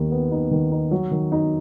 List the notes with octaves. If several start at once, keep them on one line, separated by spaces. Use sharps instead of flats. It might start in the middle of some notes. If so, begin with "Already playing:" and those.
Already playing: D#2 D#3
B3
D#4
D#3
D#4
F#3
D#3
D#4